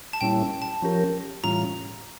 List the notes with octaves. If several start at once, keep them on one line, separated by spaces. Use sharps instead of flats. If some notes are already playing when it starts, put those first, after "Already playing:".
A5
A#2 G3 C#4 E4 G5
A5
F3 C#4 G4 A#4
A2 E3 G3 C#4 F4 A#5